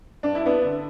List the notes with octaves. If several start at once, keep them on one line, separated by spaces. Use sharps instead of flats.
G2 D4
E4
B3 D4
D3